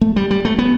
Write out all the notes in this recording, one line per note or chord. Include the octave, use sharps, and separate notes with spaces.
A3
G3
G3
A3
B3